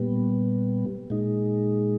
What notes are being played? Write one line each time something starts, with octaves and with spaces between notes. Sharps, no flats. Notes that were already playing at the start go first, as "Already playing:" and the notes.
Already playing: A#2 G3 B3
A#2 G#3 D#4